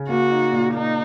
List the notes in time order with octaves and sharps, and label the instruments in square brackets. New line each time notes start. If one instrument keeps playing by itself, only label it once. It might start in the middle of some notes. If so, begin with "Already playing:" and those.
Already playing: [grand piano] C#3
[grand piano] A#3 [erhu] F#4
[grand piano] D#4
A#2
[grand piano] A#3 [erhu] D#4